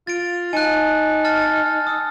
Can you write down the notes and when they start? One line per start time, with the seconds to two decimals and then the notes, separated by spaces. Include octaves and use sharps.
0.07 F4 A6 D7
0.53 D#4 G#5 A5 F#6
1.24 A5 F6 A6
1.87 D#6 E6